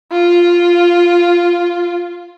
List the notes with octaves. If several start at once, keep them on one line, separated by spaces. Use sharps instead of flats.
F4